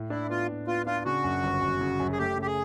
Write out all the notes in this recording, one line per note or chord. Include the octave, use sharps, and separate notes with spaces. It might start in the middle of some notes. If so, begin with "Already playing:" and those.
Already playing: A2
D4 E4
B3 F4
A2
B3 F4
D4 F4
C#3 F#4
F#2
G1
F#2
C#3
F#2
G#4
A3 G4
C#3
G4
G#4